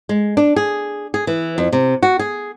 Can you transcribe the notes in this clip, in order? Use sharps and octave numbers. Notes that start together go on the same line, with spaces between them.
G#3
D4
G#4
G#4
E3
F2
C3
F#4
G#4